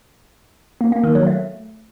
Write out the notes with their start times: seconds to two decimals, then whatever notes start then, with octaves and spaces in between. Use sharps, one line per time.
0.81 A#3
0.92 A#3
1.04 D#3
1.15 F#3
1.26 A3